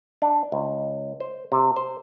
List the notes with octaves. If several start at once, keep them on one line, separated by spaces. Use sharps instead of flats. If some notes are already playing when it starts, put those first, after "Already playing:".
D4
C#2
C5
C3
C5